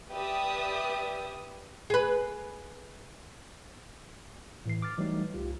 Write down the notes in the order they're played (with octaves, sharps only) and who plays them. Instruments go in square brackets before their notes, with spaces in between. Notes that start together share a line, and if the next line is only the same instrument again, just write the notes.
[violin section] G4 B4 D5 E5 D#6
[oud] G#4 B4
[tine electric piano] A2 E3 C7
D6 F6 A6
E3 F#3 G3 A3 D#4
C2 F4 G4